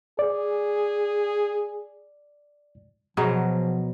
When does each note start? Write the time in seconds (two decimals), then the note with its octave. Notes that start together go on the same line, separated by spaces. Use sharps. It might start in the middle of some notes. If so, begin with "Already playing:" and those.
0.19 G#4 D5
3.17 B2 F3 F#3 G#4 C5 A#5